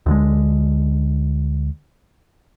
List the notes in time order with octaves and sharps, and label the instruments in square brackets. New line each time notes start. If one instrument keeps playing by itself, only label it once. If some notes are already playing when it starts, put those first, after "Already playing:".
[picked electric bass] D2 D3 G#3